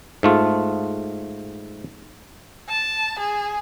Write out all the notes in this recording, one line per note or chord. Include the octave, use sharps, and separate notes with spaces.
G#2 A3 F4
A5
G#4